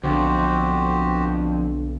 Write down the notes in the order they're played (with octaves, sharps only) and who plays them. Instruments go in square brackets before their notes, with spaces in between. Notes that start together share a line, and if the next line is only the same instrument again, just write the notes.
[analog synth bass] B1 [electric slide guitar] F2 [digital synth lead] D3 [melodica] F#4 G4 C5